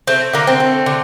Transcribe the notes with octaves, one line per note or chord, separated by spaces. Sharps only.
A3 C4
D3 A#3
C4
A3
D3